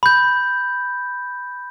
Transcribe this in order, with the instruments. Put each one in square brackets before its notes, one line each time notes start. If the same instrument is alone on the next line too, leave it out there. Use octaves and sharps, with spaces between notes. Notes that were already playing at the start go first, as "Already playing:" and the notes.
[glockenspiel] B5 G6